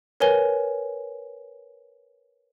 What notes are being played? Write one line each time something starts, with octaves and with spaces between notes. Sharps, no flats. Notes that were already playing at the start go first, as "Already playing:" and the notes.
A#4 B4 C#5 G#5 G7